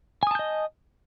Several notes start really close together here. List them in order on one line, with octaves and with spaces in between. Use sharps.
G#5 D#6 A5 G6 D#5